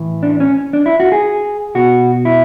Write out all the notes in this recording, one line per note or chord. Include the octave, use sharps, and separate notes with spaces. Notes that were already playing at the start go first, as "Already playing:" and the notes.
Already playing: A2 E3
D4
C#4
D4
E4
F#4
G#4
B2 F#4
E4